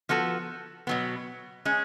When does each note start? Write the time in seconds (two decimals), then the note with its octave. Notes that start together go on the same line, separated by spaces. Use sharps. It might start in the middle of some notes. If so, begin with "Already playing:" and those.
0.09 F3 B3 F#4 A4
0.87 B2 F#3 B3
1.65 G#3 C#4 G#4